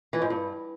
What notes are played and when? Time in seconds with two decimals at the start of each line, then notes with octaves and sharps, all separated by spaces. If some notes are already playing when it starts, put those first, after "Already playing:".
0.13 E3
0.22 G#2
0.30 G2